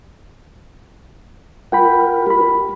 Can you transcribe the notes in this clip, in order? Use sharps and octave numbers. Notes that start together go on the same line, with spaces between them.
F4 A#4 F#5 G5 B5
G4 B5